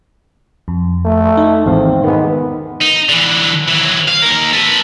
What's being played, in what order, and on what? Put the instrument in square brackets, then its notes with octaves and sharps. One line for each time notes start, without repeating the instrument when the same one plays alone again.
[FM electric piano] F2
[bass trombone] A3
[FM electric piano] D#4
[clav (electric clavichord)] G#1 E2 F5 [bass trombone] C4
[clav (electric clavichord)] D#3 G#3 [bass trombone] B3
[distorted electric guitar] D#4
D3 E3
E3 F#3
F5
D#2 A#4
A4 B4